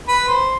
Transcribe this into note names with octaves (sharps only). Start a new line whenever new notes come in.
B4
C5